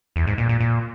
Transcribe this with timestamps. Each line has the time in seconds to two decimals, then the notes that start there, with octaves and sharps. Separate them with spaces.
0.16 E2
0.27 G#2
0.38 A#2
0.49 A#2
0.60 A#2